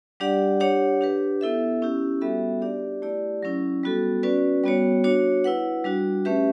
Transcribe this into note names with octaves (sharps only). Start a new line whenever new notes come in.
G3 D4 G4 D5 F#5
D4 G4 C#5 F#5
D4 G4 B4
B3 E4 A4 E5
C#4 E4 G4
G3 B3 F#4 A4 E5
D4 G4 D5
A3 E4 G4 D5
F#3 C#4 E4
G3 B3 F#4 A4
C#4 F#4 B4 D5
G3 B3 F#4 C#5
D4 F#4 C#5
E4 B4 F#5
G3 D4 F#4
A3 C#4 G4 B4 E5